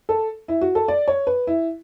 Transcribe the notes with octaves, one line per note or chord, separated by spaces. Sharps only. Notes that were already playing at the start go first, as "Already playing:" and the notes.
A4
E4
F#4
A4
D5
C#5
B4
E4